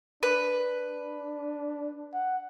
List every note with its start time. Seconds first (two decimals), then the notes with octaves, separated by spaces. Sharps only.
0.23 D4 B4
2.14 F#5